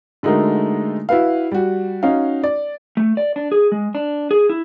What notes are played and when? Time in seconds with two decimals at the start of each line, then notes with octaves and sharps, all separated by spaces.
0.23 D3 G#3 A3 D#4 F#4 A#4
1.09 E4 F#4 B4 F5
1.52 G3 F#4
2.03 C#4 D#4 F#4 F5
2.44 D5
2.97 A3
3.17 D5
3.36 D4
3.52 G#4
3.72 G#3
3.95 D4
4.31 G#4
4.50 E4